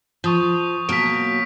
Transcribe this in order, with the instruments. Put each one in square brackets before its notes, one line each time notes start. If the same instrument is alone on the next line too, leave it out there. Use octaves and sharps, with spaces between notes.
[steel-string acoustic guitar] F3 [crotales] C#6 D#6 G6
[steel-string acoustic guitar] B2 F#3 A#3 [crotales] B6 D7